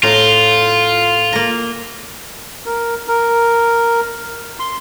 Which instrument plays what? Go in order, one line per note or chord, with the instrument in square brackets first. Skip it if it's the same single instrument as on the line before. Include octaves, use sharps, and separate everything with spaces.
[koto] A2 A#5 [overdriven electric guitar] F4
[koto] A#3 A#5
[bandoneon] A#4
A#4
C6